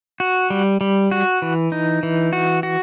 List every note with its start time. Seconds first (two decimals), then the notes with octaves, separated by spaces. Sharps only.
0.20 F#4
0.50 G3
0.81 G3
1.11 F#4
1.42 E3
1.72 D#4
2.03 E3
2.33 F#4
2.63 F#4